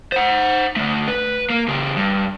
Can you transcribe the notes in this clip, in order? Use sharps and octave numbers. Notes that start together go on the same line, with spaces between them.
C5 F#5
D3 A3
B4
A#3
C#3 G4
G2